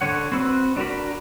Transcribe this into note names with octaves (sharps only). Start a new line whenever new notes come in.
D3 C#5 F#5
C4 F#4 B4 B5 E6
D4 F#4 A#4 B5